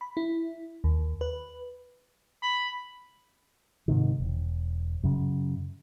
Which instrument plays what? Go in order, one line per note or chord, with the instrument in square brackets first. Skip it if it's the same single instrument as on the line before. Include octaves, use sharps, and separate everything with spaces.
[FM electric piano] B5
E4
D#2
B4
[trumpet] B5
[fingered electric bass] G#2 C3 D#3
E1
F#2 C#3